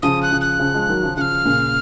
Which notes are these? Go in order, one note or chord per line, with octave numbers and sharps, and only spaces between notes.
C#3 F3 D#6
F#6
C#3 F3
F#6
C#3 F3
F3 G#3
D#3 F#3
C#3 F3
C#3 F3 F6 F#6
A#2 C#3